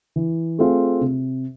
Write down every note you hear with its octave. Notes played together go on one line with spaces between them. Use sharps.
E3
A3 C4 F4 G#4
C3